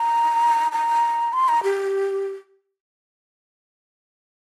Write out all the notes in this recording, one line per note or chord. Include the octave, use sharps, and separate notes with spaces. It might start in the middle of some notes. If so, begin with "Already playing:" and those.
Already playing: A#5
A#5
C6
A#5
G4